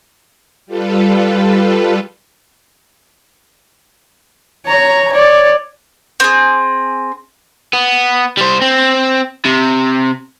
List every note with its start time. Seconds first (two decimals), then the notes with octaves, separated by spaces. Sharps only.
0.66 G3 F4 A4 B4
4.66 C#5 A#5
5.12 C#5 D5
6.20 C4 G#4
7.73 B3
8.37 G3 C5
8.61 C4
9.45 C3